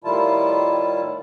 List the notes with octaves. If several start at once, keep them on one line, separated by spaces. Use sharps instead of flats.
A2 D#3 G3 E4 F4 A5